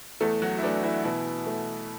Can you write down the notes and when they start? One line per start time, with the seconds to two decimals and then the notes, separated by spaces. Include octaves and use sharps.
0.20 E2 A3 A4
0.42 F#3 F#4
0.58 E4
0.63 E3 A3 D4
0.83 E3 E4
1.04 B2 E3 E4
1.47 A3